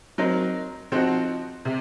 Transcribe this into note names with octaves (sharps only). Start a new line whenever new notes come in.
F#3 C4 D#4 A#4
F3 C4 D#4 F#4
C3